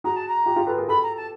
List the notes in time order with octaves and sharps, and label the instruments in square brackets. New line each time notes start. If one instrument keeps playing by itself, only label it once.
[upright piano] F#4 G#4 [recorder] A#5
[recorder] A5
A#5
[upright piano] F4 G4
F4 G4
A4 B4
G#4 A#4
[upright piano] G4 A4 [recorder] B5
[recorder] A#5
A5